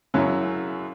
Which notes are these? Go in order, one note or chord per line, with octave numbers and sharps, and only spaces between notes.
F#2 C#3 F#3 C#4 E4